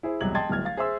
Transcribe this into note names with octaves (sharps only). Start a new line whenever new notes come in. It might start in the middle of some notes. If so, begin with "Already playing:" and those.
E4 G#4 C5
E1 C2 F#3 G#6 F#7
D#5 G5 A5 C6 G#6 A6
D1 G1 F6 G#6
F5 A6
G#4 C5 E5 C6 E6